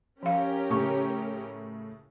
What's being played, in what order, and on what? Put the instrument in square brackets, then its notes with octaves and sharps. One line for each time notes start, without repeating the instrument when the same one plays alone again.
[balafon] F3 F5 [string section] C#4 G4 A#4
[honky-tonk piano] A2 C#3 C#6